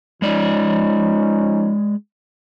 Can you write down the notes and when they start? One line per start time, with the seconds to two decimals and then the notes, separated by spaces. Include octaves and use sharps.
0.22 F3 G#3 C#4 D#4 D5